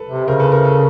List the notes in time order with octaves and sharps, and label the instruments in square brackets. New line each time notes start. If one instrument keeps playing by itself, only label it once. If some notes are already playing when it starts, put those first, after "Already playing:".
Already playing: [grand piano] A4 B4
[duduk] C3
[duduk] C#3 [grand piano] A#4 C5
[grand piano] A4 B4
A#4
A4